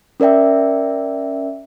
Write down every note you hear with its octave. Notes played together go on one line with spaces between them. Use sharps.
C#4 A#4 D5 E5 G5